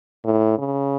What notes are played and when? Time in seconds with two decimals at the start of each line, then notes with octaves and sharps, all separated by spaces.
0.25 A2
0.58 C#3